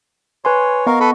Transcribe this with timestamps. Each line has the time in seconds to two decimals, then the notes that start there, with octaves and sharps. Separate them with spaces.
0.45 B4 C#5 G#5 C6
0.86 B3 A#4 D#5 F5 C#6
1.00 A4 B4 B5